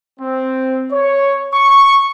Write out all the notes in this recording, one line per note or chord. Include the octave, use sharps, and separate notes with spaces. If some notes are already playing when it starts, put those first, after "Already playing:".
C4
C#5
C#6